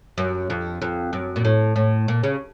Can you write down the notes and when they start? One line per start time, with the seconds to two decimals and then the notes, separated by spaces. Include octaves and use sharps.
0.18 F#2
0.50 F2
0.82 F2
1.13 F#2
1.36 A#2
1.45 A2
1.76 A2
2.08 A#2
2.23 C#3